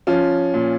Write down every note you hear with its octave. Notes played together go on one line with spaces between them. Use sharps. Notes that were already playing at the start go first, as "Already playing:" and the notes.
F3 C#4 F4
A#2